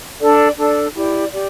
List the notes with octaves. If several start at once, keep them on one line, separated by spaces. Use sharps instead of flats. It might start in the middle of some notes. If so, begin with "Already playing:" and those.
D4 A4 D5
D4 A4 D5
E4 G4 D5
G4 D5